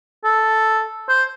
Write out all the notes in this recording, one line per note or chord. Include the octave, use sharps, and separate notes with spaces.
A4
C5